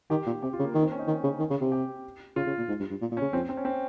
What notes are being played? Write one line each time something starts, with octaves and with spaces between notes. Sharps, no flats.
D#3 G4
A#2
C3 G4
F4
C#3
A#3
D#3 A#3
C4
C#4
D#4
D#3
C#3
D#3
C#3
C3
G4
C#3 F4
C#3
A#2
G#2
G2
G2
A#2
A#2
C#4
C#3
F2 C4
C4
C#4
C4